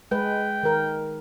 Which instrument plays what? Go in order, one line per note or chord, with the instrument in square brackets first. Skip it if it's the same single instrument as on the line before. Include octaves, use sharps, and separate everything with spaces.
[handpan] G#3 B4 [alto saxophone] G5
[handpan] D#3 A#4